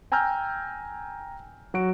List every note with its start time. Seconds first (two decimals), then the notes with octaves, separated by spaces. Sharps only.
0.12 G5 G#5 A#5 E6 F6 G6
1.74 F#3 F#4 D7